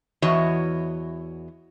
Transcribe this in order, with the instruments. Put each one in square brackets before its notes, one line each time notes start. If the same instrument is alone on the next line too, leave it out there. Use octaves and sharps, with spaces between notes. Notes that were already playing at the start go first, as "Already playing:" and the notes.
[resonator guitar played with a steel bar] E2 E3 F#4 C#5 D#5